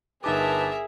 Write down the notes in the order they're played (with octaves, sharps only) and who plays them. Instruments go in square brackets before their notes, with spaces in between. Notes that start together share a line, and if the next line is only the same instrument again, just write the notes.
[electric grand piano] G1 D#4 D6 [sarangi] G#4 [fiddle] A#4 E5 [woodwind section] B4 A5